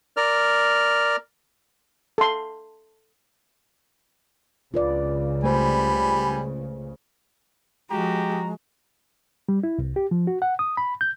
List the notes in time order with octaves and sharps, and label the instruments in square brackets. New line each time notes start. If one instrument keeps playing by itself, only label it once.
[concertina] A#4 D5 F6
[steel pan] A4 C6
[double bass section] C#2 C#3 [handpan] F4 B4 D5
[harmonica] G3 G#5 B5 [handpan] A3 C5
[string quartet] F3 F#4 [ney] G#3 [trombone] G4 [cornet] A#5
[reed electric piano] G3
E4
C2
G4
F3
F#4
F#5
D#6
B5
G6